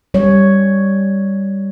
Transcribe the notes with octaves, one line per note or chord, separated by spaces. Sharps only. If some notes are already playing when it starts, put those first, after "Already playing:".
G3 C#5